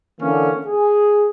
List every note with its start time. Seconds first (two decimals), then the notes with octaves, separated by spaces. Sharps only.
0.21 D3 E3 A#3 C#4
0.67 G#4